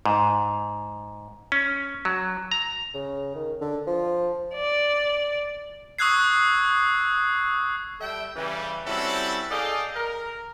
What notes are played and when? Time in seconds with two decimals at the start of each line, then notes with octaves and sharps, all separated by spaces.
0.06 G#2
1.52 C#4
2.05 F#3
2.52 A#5
2.94 C#3
3.35 D#3
3.61 D3
3.87 F3
4.54 D5
5.99 C#6 D#6 E6 F#6 G#6 C7
8.00 G3 A4 E5 G5
8.35 C#3 E3 G3
8.85 G3 C4 C#4 E4 F#4 A4
9.50 G#4 A4 D5 D#5 F5 G5
9.94 A#4